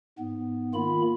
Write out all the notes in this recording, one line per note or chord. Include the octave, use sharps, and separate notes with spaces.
G#2 B3
D#3 A#3 F4 B5